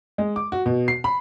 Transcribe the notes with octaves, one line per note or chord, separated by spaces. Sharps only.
G#3
D6
F#4
B2
C7
B5